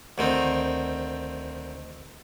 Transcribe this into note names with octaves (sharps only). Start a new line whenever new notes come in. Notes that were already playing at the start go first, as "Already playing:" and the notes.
D2 D#3 C4